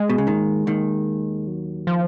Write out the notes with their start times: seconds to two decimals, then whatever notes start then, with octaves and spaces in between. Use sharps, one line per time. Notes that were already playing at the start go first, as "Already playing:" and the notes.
Already playing: G#3
0.10 B2
0.18 C#3
0.27 D#2 D#3
0.67 D#2 D#3
1.47 F#3
1.87 F3